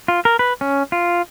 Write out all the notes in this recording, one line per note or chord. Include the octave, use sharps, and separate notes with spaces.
F4
A#4
B4
C#4
F4